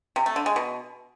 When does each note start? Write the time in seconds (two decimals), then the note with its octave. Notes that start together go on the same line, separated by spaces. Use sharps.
0.16 C3
0.26 A3
0.36 D3
0.46 G#3
0.56 B2